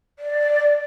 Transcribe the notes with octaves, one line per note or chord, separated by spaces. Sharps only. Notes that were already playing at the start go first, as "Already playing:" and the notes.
D5